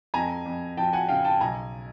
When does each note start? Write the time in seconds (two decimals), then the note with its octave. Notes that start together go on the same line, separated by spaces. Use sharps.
0.14 F2 G#5 A#5
0.45 F2
0.77 F3 G5 A5
0.93 F#5 G#5
1.09 C#3 F5 G5
1.25 G5 A5
1.41 B1 G#5 A#5